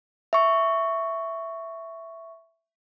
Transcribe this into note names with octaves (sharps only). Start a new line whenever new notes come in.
E5 C#6